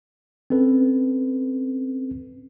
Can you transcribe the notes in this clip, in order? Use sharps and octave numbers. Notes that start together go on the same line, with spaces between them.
C4 C#4 A4 B4